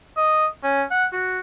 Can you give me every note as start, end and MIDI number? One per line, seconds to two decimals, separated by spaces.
0.17 0.46 75
0.63 0.83 61
0.91 1.05 78
1.12 1.39 66